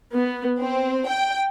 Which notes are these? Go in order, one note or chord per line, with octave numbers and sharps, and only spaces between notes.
B3
C4
G5